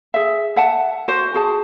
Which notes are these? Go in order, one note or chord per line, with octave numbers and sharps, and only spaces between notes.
G#4 E5
E5 F#5 A5
F#4 C5
F#4 G#4 A5